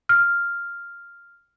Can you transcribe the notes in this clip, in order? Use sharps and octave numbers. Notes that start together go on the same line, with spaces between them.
F6